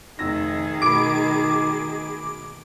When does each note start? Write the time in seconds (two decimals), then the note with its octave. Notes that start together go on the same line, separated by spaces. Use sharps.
0.19 F1 D#3 D#4 G#4 E6 A#6
0.82 B2 A3 B5 D6